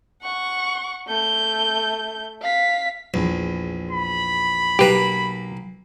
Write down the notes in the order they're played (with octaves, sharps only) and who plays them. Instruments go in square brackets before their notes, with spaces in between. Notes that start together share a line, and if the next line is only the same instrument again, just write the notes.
[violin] F#5 C#6
A3 G6
F5 B6
[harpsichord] A#1 E2
[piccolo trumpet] B5
[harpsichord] B1 A#3 A#5 [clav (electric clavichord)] G4 B4